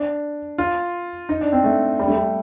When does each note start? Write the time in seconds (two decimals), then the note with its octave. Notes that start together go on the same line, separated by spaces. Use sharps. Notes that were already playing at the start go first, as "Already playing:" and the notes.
Already playing: D4
0.58 F4
1.29 D#4
1.41 D4
1.52 C4
1.64 A3
1.99 G3
2.08 A3
2.16 G3